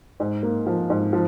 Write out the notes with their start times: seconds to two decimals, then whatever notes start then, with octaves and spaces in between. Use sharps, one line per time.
0.20 G#2
0.43 A#3
0.66 F3
0.90 G#2
1.13 F3